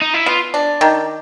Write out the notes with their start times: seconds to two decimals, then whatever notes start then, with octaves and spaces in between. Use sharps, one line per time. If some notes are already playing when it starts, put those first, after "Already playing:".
0.01 D#4
0.14 E4
0.26 B3 F4
0.54 D4
0.81 D#3